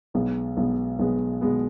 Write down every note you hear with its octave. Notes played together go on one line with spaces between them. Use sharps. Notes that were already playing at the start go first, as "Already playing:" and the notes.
B1 B2 G#3 B3
B1 B2 G#3 B3
B1 B2 G#3 B3
B2 G#3 B3